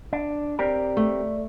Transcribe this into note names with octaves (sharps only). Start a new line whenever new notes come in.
D4
C4 G4 A#4 D5
A3